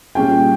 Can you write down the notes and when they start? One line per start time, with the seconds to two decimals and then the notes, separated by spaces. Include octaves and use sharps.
0.15 A#2 G3 C#4 G#4 G5